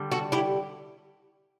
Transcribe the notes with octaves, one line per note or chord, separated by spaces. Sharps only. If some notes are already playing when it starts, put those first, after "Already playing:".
Already playing: D3 G3
F#4 A4
E4 G4